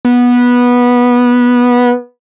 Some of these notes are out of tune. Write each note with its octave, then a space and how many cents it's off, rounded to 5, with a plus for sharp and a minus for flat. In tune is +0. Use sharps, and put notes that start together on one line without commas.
B3 -15